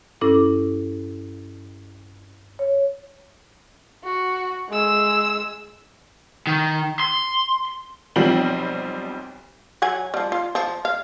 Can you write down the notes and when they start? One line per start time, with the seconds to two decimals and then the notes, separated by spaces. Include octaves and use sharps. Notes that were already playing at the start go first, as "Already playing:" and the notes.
0.21 G2 C#4 E4 A4 D6
2.59 C#5
4.04 F#4
4.69 G#3 E6
6.47 D#3
7.00 C6
8.16 B1 F3 G3 C4 F#7
9.82 F#3 F#5 G#5
10.14 F3 G3
10.32 F4
10.55 F3
10.85 F5